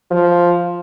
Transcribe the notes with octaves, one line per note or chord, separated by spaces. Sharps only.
F3